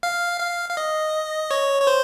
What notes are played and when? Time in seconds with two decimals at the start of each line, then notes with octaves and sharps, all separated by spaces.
0.03 F5
0.40 F5
0.69 F5
0.77 D#5
1.51 C#5
1.82 C#5
1.87 C5